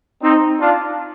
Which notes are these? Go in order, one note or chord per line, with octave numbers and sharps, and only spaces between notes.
C4 D#4
D4 F4